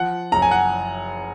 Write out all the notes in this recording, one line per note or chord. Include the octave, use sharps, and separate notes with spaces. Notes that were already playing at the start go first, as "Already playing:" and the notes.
Already playing: F3 F#5
F#1 A#5
G#5
F#5